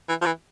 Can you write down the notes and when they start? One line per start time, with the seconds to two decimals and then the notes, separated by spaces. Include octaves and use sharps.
0.09 E3
0.21 F3
0.26 E3